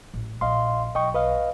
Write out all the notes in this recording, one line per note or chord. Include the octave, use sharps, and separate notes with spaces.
A1
A#1 D#5 F5 C6
B1 D#5 G5 C#6
B4 D#5 F5